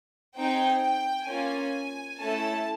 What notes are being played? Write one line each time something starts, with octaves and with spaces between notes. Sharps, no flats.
C4 D#4 G#4 G5
G5
A#3 C#4 F4 G#5
A3 C#4 E4 A4 A5